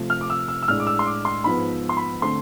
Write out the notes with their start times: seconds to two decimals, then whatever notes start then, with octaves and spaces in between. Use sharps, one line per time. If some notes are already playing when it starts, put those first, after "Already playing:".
Already playing: C3 F3 A3
0.10 F6
0.21 D6
0.30 E6
0.48 E6
0.63 E6
0.68 A2 G#3 D4 F6
0.80 D6
0.87 E6
0.99 C6
1.06 D6
1.25 C6
1.44 G#2 F3 B3 B5
1.89 C6
1.97 B5
2.22 D3 A3 C4 C6